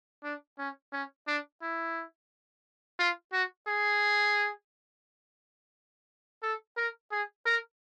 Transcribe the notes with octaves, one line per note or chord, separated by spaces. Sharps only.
D4
C#4
C#4
D4
E4
F4
F#4
G#4
A4
A#4
G#4
A#4